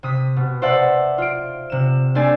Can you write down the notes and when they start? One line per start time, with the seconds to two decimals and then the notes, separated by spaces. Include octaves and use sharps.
0.03 C3 D#6 B6
0.36 B2
0.62 C5 D5 E5 F#5 A5
1.18 F4 D7
1.70 C3 E7
2.15 A3 C4 D4 D5 G#5